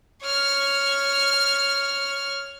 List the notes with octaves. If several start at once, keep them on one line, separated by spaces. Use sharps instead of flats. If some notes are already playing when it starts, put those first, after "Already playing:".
C#5 F6